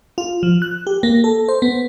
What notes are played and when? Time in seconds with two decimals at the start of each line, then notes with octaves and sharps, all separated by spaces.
0.18 F4
0.43 F3
0.62 F#6
0.87 G4
1.03 A#3
1.24 A4
1.48 C5
1.62 B3